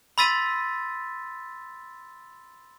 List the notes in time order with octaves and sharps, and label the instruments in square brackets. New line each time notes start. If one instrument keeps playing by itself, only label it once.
[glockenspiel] B5 C6 E6 A6 B6 D#7